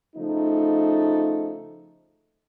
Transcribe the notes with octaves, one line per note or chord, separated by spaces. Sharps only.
C#3 F3 A3 D#4